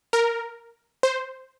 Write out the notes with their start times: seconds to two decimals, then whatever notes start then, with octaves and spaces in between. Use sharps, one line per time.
0.13 A#4
1.03 C5